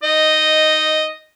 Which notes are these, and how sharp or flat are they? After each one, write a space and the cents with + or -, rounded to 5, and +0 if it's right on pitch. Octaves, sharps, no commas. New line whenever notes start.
D#4 +0 D#5 -5